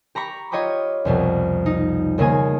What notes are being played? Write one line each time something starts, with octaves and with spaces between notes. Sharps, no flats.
G4 A#5 B5 C#6
F4 C#5 D#5 G5 B5 D6
C2 F2 B2
D#4
D#2 C#3 A#3 G#4 G#5